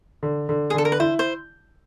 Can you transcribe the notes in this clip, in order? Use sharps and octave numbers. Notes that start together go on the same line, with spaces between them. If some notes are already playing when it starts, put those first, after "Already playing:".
D3
D3
G#4
D3 A4
A#4
B4
E4 C5
C5